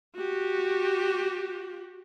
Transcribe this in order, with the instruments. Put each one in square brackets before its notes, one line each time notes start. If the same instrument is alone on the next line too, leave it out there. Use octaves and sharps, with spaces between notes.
[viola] F#4 G4